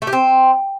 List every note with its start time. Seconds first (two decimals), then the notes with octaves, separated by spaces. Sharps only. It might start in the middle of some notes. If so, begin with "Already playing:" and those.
0.02 A3
0.07 G4
0.13 C4